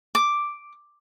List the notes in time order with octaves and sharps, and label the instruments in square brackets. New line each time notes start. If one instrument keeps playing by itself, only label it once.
[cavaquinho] D6